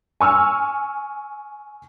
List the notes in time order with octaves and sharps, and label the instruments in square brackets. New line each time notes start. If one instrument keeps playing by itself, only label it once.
[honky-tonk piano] G#5 C#6 E6 F6